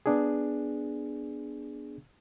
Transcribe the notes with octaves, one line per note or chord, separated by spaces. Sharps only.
B3 D4 G#4